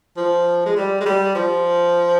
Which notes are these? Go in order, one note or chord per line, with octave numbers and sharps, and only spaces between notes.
F3
G#3
G3
G#3
G3
F3